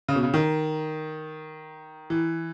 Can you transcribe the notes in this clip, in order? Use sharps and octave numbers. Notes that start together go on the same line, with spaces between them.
C#3
B2
C#3
D#3
E3